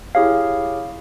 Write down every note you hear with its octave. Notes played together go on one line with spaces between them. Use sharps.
E4 G4 G#4 C#5 F5